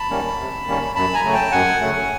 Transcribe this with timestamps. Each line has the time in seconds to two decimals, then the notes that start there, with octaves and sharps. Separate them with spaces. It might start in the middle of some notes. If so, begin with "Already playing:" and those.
Already playing: A5 B5
0.10 D#3 G3 A#3 C#4
0.39 C3
0.68 D#3 G3 A#3 C#4
0.95 F#2 A5 B5
1.14 G#5 A#5
1.23 C#3 F#3 A3
1.33 G5 A5
1.52 F#2 F#5 G#5
1.81 C#3 F#3 A3